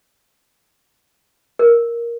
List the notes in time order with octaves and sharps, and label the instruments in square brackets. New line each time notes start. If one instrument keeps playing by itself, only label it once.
[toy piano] A#4